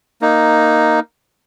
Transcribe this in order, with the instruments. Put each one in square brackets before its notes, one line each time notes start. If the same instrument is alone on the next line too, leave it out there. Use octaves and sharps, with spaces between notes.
[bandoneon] A#3 D#4